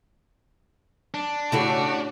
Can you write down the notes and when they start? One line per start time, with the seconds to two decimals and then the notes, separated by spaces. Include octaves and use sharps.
1.14 D4
1.52 A2 C#3 E4 F#4 G4 A4